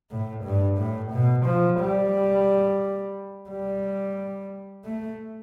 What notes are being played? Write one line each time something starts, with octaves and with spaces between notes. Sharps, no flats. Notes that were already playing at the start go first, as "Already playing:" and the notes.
A2
G2
A2
B2
F3
G3
G3
A3